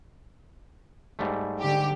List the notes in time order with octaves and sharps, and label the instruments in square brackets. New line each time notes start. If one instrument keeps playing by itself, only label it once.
[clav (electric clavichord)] G#2 G3 A3
[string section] D3 G4